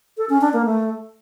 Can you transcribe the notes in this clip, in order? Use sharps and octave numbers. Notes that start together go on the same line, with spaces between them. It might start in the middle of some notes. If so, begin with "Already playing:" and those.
A4
C#4
D4
A#3
A3